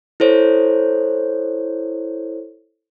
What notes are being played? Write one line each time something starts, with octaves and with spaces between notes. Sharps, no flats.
E4 A4 C5 C#5